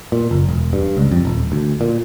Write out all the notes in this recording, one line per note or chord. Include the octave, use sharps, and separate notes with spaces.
A#2
F#1
E1
G2
C#2
F2
D#1
D2
A#2